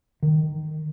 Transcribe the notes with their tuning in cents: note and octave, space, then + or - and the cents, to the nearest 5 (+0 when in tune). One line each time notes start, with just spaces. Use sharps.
D#3 -10